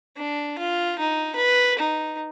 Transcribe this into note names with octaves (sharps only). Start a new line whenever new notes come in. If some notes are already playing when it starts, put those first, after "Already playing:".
D4
F4
D#4
B4
D#4